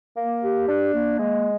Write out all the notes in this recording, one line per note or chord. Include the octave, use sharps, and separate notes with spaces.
A#3
G4
D4
A#3
G#3